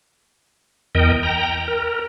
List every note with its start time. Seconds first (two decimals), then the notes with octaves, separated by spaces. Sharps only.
0.95 E2 A#4 D#5 G5
1.23 G5 A#5
1.68 A#4